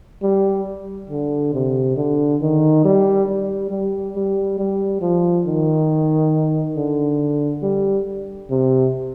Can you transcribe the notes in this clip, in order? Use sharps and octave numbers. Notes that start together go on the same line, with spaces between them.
G3
D3
C3
D3
D#3
G3
G3
G3
G3
G3
F3
D#3
D3
G3
C3